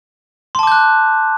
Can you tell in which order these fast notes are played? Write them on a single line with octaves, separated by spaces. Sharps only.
C6 A5 D6 G6 F#6